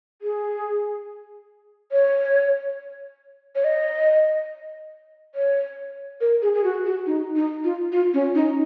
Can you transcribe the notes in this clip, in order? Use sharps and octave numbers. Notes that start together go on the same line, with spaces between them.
G#4
C#5
C#5
D#5
C#5
A#4
G#4
G#4
F#4
F#4
D#4
D#4
F4
F4
C#4
D#4